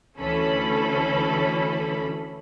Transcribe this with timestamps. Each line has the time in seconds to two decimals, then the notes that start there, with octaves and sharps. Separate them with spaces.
0.18 D2 D3 E3 C#4 A4 B5